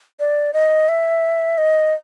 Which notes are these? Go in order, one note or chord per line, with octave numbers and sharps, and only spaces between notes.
D5
D#5
E5
D#5